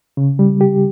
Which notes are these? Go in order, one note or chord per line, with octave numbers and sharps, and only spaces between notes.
C#3
G3
G4